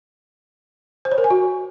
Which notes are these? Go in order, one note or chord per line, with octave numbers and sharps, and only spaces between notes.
C5
C#5
A#4
G#5
F#4